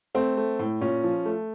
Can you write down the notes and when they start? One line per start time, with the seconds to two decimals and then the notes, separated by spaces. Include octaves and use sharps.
0.15 A3 C4
0.37 A3
0.59 A2
0.81 A#2 C#4
1.04 F3
1.25 A3